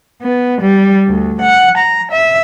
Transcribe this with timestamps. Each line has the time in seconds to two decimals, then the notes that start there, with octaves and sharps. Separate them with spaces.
0.22 B3
0.61 G3
1.07 D2
1.41 F#5
1.78 A#5
2.11 E5